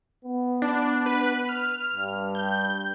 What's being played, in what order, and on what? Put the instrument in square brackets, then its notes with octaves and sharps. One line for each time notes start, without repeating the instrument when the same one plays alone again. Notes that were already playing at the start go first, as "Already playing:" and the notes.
[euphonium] B3
[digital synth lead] D4
B4
F6
[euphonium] G2
[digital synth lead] G6